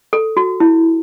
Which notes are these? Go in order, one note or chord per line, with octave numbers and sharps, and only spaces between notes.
A4
F#4
E4